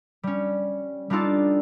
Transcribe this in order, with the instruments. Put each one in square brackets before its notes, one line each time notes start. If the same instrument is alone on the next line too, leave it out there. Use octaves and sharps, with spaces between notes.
[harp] G3 C#4
G3 D4 D#4 F4 A4